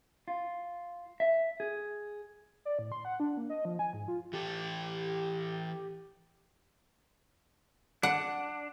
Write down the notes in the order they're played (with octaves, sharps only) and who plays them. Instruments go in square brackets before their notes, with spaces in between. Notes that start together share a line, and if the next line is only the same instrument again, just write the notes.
[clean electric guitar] F4
E5
G#4
[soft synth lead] D5
A2
C6
F#5
D4
A#3
D#5
F3
G#5
G#2
F4
[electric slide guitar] E3 A4 [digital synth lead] G4
[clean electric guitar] D4 [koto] F#5